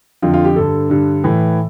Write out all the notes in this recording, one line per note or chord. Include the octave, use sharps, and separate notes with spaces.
F2 D3 F4
F4
G4
G2 D3 A4
G2 D3
A2 E3